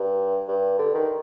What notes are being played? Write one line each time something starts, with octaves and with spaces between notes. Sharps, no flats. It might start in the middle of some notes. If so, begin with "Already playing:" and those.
Already playing: G2
G2
D3
D#3